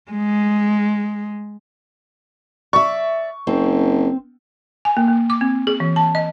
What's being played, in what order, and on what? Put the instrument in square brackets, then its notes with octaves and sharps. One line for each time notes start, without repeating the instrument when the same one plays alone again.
[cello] G#3
[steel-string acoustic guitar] D5 E5 [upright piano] C#6
[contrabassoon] F#1 [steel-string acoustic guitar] C4
[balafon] G#5
A#3
A#3
D6
C4
G#4
E3
A5
D#5